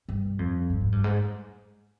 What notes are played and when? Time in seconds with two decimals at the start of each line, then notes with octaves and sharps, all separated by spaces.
0.09 G2
0.39 F2
0.70 G2
0.81 G#2
0.92 G2
1.04 G#2